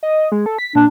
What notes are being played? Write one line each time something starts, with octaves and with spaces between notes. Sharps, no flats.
D#5
G#3
A4
B6
A#2 D4